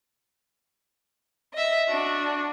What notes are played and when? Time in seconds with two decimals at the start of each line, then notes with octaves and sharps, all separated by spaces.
1.54 D#5 E5
1.89 D4 F#4